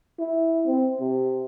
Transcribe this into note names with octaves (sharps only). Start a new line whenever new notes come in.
E4
C4
C3